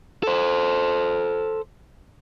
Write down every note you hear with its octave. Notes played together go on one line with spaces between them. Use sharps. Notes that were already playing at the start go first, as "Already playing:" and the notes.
A4 C5